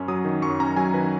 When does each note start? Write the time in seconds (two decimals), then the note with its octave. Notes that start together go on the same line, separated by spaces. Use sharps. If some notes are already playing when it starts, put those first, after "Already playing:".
Already playing: F#2 C#4
0.08 F#3 D#6
0.25 D#3
0.42 F#2 C#6
0.60 C#4 A#5
0.77 F#3 G#5
0.94 D#3 B4